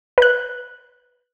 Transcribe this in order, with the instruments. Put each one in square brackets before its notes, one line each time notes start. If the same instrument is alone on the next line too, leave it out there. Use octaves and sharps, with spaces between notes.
[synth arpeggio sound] B4 F#6